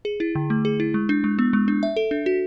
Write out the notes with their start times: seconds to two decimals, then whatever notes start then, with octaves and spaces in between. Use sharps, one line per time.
0.05 G#4
0.20 E4
0.35 D3
0.50 A3
0.65 G#4
0.80 E4
0.94 G#3
1.09 D4
1.24 G#3
1.39 B3
1.53 G#3
1.68 D4
1.83 E5
1.96 A4
2.11 D4
2.26 F#4